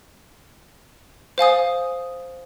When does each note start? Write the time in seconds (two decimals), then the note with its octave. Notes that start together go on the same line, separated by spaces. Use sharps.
1.38 C5 F5 G#5 D#6